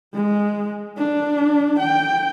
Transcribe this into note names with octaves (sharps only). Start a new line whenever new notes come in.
G#3
D4
G5